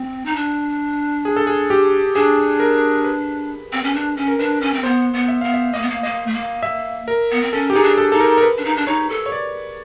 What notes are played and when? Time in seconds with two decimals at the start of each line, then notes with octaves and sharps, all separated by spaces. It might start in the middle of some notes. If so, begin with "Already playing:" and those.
Already playing: C4
0.26 D#4
0.36 D4
1.25 G#4
1.36 A4
1.47 G#4
1.70 G4
2.15 D4 G#4
2.60 A#4
3.05 B4
3.73 C4
3.83 C#4
3.94 D4
4.17 C#4
4.28 A#4
4.39 D4 B4
4.61 C#4
4.74 C4
4.83 B3 C5
5.14 B3
5.28 E5
5.41 B3 F5
5.54 E5
5.73 A#3 D#5
5.82 B3
5.89 A#3
6.03 A#3 D#5
6.27 A3
6.33 A#3
6.63 E5
7.08 A#4
7.31 B3
7.42 C4
7.53 C#4 A4
7.70 G4
7.74 D#4 G#4
7.82 D4
7.98 A4
8.12 D#4 A4
8.20 A#4
8.38 A#4
8.43 B4
8.58 D4
8.65 D#4
8.76 D4
8.87 D#4 C#5
9.10 A4
9.26 C#5
9.32 D5